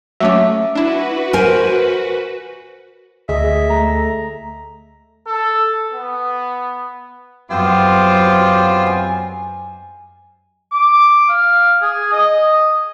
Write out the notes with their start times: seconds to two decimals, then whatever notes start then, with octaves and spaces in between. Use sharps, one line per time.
0.20 F#3 A3 C#4 E5 D6
0.75 D4 E4 F#4 B4
1.33 A#4 C5 G#5
3.29 D2 G#4 D#5 E5
3.70 A3 A#5
5.26 A4
5.93 B3
7.51 F#2 B3 C4 F4 G4 C5
8.87 G#5
10.72 D6
11.29 F5
11.82 G#4
12.12 D#5